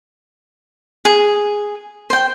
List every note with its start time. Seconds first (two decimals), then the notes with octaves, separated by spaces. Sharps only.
1.05 G#4
2.10 C5 G5